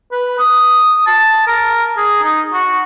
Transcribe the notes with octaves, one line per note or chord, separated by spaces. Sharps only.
B4
D#6
A5
A#4
G#4
D#4
F#4